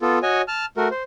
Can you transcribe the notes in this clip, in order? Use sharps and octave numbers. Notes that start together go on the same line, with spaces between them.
B3 F4 A4
F#4 C#5 D#5 G#5
A5 F6
A3 F#4 A#4
C5